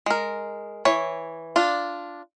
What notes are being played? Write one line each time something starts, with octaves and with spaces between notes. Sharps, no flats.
G#3 A#4
E3 C#5
D4 F4